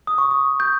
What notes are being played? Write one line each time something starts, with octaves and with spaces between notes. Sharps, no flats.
D#6
C#6
D#6
G6